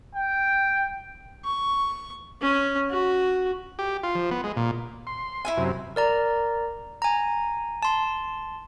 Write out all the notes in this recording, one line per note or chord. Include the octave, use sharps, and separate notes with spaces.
G5
C#6
C#4
F#4
G4
F4
F3
B3
G#3
A#2
C6
E4 E5 G#5
F#2 C3
A#4 D5 A#5
G#5 A#5
A5 C6